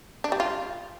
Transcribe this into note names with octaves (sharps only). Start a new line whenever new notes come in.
D4
G3
F4